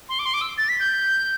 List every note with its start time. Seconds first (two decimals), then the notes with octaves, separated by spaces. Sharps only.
0.09 C6
0.19 D6
0.25 C6
0.34 D6
0.41 E6
0.58 A6
0.69 B6
0.80 G6